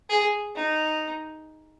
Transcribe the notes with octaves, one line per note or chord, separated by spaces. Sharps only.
G#4
D#4